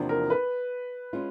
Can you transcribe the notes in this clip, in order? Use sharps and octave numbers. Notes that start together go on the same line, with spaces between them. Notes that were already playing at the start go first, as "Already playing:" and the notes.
Already playing: E2 C3 F3 A#3 D4
A#4
B4
G#3 C#4 F4